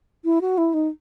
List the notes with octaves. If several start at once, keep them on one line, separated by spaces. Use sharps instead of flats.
E4
F#4
E4
D#4